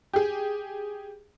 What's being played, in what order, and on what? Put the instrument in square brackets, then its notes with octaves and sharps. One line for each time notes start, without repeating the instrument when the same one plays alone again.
[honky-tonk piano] G4 G#4